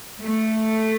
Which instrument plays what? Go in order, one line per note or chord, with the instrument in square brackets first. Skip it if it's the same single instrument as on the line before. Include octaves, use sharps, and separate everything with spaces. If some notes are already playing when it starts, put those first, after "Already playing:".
[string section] A3